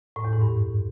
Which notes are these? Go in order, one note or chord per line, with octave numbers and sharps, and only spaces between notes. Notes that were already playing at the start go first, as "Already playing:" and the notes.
A2
E2
G#2
G2